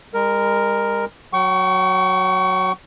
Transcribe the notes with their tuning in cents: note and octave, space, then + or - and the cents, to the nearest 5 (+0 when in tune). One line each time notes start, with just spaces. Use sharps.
G#3 -40 A#4 +0
F#3 +0 G5 -40 C#6 +10